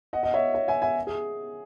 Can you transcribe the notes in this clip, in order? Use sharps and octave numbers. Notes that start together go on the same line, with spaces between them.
D#5 F#5
D#5
C#5 E5
C#5 E5
E5 G#5
E5 G#5
G#4